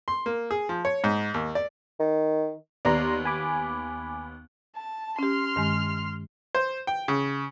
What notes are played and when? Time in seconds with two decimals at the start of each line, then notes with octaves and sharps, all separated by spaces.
0.08 C6
0.26 A#3
0.51 G#4
0.69 F3
0.85 C#5
1.04 G#2
1.34 D#2
1.55 D5
2.00 D#3
2.85 D#2 B3 D5 A#5 C6
3.25 G#5 B5 D6
4.76 A5
5.19 C#4 G4 C6 F6
5.56 G2 D#3 G#3
6.55 C5
6.87 G5
7.08 C#3